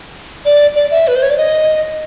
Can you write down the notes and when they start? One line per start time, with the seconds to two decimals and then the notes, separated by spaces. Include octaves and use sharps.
0.45 D5
0.75 D5
0.91 E5
1.07 B4
1.15 C5
1.22 C#5
1.30 D5
1.37 D#5